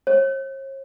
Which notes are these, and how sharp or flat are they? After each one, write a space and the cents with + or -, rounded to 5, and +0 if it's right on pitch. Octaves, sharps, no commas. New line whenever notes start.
C#5 -45